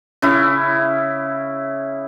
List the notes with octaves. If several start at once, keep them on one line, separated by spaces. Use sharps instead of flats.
C#3 E4